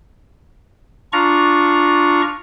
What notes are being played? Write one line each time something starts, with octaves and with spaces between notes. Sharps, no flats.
D4 F4 A#5 C#6